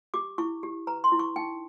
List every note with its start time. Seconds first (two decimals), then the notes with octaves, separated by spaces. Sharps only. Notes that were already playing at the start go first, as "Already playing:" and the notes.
0.14 G4 D6
0.38 E4 C#6
0.63 G4
0.87 B4 A#5
1.04 C6
1.12 E4
1.19 C#6
1.36 D#4 G5